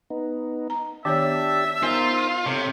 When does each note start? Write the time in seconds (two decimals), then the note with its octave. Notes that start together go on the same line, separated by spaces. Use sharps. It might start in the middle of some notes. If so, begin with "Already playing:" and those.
0.10 B3 D#4
0.70 A#5
1.05 D#3 B3 D4 G4 C#5 E5 A5
1.83 B3 D#4 F4 A#4 C5
2.46 C3 A4 C#5